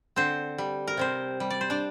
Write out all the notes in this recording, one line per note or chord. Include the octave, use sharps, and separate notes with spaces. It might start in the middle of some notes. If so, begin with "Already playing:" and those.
D3 C4 C5
G3
A#4
C3 C4 C5
G3
D5
C5
D4 D5